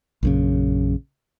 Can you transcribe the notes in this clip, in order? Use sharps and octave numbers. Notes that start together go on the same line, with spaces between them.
A#1 F#2 C#3